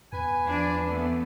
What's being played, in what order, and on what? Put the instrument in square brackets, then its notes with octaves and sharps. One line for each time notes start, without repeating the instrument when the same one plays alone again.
[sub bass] E2 [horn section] B4 G#5
[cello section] F3 D4
E3 A3 B3